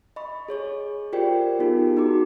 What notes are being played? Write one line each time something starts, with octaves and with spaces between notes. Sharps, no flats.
D#5 B5 C#6
G#4 C#5 C#6
F4 G4 A#4 C5 D5 G5
B3 D#4 F4 G#4 A#4
D#4 F#4 A#5 D6